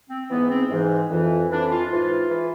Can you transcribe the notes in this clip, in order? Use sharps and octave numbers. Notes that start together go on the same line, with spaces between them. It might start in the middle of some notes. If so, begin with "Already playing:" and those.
C4
G#2 E3 B3
C4
G#2 E3
F2 E3
F2 E3 D4
F4
G#2 E3 F4
E3